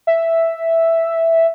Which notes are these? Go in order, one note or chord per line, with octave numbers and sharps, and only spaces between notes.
E5